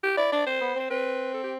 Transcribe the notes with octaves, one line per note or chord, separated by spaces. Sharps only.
G4
E4 D5
D4 D5
C4 C5
B3
C4 C5
C4 B4
A4
G4